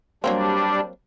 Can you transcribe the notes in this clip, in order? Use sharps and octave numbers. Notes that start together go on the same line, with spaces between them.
F#3 G3 A#3 C4 D4